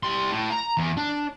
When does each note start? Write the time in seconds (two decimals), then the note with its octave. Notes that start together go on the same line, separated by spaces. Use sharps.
0.03 G3 C6
0.31 A2
0.51 A#5
0.78 E2
0.97 D4